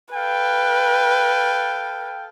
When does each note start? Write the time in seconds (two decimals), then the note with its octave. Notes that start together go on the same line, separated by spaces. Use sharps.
0.15 A4 B4 F5 G5